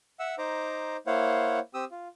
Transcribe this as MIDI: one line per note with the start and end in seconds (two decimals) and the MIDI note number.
0.20 0.35 76
0.20 0.35 78
0.20 0.35 88
0.38 0.97 63
0.38 0.97 72
0.38 0.97 82
0.38 0.97 86
1.07 1.59 58
1.07 1.59 64
1.07 1.59 72
1.07 1.59 73
1.07 1.59 77
1.07 1.59 78
1.74 1.85 60
1.74 1.85 67
1.74 1.85 87
1.74 1.85 88
1.91 2.08 65